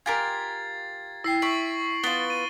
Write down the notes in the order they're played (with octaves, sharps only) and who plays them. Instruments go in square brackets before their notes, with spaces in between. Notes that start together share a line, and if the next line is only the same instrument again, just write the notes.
[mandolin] F4 G4 A#4 [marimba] G#5 [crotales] G#6 A6 C7
[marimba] E4 G5 [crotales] A#6 C7
[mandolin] E5 [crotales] C#6 D7 F#7
[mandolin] B3 F4 [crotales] A6 D7 G7
[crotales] D#7